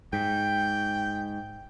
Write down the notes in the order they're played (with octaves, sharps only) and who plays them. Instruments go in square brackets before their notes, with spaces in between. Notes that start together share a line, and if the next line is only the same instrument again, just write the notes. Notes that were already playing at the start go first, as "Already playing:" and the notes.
[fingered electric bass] G#2 [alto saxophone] G5